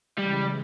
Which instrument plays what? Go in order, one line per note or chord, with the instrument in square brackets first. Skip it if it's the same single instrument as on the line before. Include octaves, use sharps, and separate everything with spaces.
[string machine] C#3 E3 G#3 [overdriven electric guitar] G3